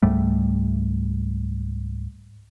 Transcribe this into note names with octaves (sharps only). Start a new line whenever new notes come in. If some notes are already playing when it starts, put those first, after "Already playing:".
C#2 G#2 G3 A3